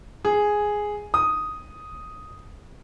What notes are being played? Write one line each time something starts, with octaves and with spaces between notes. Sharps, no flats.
G#4
D#6